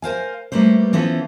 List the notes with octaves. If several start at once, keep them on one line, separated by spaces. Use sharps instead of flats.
A#4 C5 F5 G#5
G3 A3 A#3 B4 C5
E3 B3 C#4 F4 A4 C5